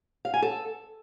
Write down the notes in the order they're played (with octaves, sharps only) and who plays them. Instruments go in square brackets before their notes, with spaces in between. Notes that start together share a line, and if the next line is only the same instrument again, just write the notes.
[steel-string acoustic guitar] F5
G#5
A4